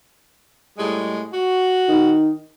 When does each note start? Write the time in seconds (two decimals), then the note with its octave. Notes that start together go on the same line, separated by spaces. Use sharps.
0.78 A2 G3 G#3
1.32 F#4
1.88 D#3